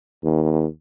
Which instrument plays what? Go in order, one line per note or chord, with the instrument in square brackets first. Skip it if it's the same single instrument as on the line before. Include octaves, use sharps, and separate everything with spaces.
[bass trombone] D#2